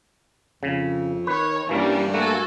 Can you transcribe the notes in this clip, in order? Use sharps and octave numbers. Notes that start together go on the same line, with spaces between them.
F2 C#3
D#3 B4 C#5
G2 E3 G3 A#3 C#4 D4
A3 A#3 F#4 A4 G#5